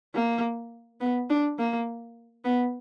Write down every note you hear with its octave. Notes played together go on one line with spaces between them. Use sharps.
A#3
B3
D4
A#3
B3